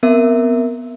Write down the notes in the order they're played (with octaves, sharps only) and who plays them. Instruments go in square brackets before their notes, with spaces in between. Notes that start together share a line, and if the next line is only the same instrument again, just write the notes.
[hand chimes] B3 C4 A#4 E5